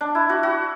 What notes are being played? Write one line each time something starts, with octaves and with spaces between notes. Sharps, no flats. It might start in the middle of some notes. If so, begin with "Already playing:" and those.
D4
E4
F#4
F#4